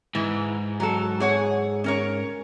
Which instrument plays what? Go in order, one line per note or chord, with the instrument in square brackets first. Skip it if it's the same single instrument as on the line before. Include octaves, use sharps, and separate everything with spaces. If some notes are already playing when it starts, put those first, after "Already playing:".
[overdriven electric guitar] G#2 [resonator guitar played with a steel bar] E3
[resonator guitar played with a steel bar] F#3 A4
G#4 C#5 F#5
C#4 A#4 C#5